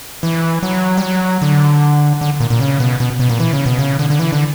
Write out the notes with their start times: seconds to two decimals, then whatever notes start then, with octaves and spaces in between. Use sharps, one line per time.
0.23 E3
0.63 F#3
0.97 G3
1.02 F#3
1.42 D3
2.21 D3
2.40 A#2
2.50 A#2
2.60 C#3
2.80 B2
3.00 B2
3.20 B2
3.30 A#2
3.40 E3
3.53 C#3
3.66 B2
3.79 C#3
3.99 D3
4.10 D3
4.19 E3
4.32 D3